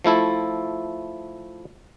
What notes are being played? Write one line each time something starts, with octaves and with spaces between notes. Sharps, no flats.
F3 A3 E4 A4